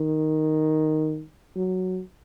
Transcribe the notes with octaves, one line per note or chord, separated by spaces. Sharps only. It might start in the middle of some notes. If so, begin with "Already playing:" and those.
Already playing: D#3
F#3